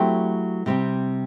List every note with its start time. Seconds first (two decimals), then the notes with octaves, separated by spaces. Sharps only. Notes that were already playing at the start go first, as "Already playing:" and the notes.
Already playing: F#3 A3 C4 E4 G4
0.66 C3 G3 C4 G4